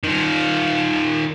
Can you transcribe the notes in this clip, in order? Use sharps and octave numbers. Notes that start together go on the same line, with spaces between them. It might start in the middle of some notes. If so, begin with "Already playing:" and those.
D#3 F4